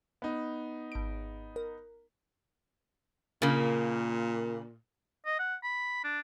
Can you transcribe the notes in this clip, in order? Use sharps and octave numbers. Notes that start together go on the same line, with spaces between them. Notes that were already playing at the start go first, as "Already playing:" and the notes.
B3 D#4
G#1 D7
A#4
A#2 C#3 A#3
D#5
F#5
B5
D4